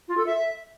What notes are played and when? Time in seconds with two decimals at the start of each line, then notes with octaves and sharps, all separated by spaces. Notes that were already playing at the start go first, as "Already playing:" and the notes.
0.08 F4
0.17 A4
0.26 E5